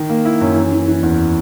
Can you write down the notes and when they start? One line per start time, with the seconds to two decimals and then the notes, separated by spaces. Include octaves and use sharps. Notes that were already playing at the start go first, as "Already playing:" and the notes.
Already playing: D#3
0.10 A#3
0.25 E4
0.41 F#2
0.56 E3
0.72 E3
0.88 E3
1.03 E2